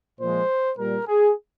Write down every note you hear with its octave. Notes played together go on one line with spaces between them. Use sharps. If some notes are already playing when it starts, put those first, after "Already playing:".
A#2 F3 G#3 C5
A#2 G3 A#4
G#4